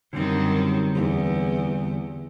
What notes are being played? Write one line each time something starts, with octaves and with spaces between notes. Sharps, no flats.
F#2 D3 D#3 G3 C4
E2